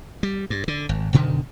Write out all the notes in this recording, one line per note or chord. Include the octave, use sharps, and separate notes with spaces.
G3
G2
D3
G#1
F#1 B2 D3 D#3